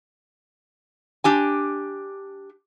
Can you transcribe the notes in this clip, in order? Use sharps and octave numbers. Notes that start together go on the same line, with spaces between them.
D4 G4 G#5